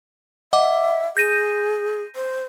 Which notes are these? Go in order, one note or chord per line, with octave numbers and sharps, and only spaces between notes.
D#5 E5 F#5 D6
G#4 G6 A#6 D#7
C5